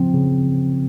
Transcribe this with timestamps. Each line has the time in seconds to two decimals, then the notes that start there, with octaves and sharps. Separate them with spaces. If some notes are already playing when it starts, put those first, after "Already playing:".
Already playing: C#3 F3 C4
0.14 C#3